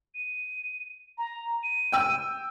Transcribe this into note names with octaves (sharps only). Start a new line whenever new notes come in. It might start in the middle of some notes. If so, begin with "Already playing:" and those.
D#7
A#5
D#7
G5 E6